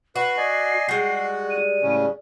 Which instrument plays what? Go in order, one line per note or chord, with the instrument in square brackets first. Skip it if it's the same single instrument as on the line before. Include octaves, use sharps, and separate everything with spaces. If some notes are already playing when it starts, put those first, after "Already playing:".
[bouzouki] F#4 [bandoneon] B4 [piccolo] C7
[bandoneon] D5 D#5 G#5
[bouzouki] G3 G#3 [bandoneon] F#4 F#5
[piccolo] D#7
[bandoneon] A2 C#3 C#4